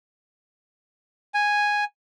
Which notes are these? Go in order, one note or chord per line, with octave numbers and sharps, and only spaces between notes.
G#5